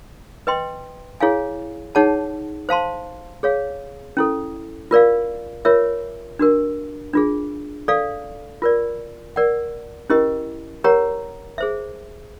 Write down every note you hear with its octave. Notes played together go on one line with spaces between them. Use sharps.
B4 D#5 G5 C6
E4 G#4 C#5 F5 G#5
D#4 G#4 C#5 F#5 A5
C5 F5 A5 C6
G#4 C#5 F5
C#4 E4 A4
F4 A#4 D5 F5
F4 A#4 C#5 E5
D4 F#4 A#4
D4 F4 G#4
A4 D5 F5
F4 A#4 D5
A#4 D5 F#5
C#4 E4 G4 A#4 D#5
G4 A#4 C#5 F#5 A#5
G#4 C5 E5